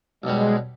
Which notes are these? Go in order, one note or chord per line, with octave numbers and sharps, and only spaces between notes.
B1 B2 G3 G#3